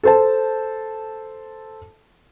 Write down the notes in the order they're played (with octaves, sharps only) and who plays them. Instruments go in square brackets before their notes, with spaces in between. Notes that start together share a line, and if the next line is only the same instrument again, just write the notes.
[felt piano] A4 C5 A5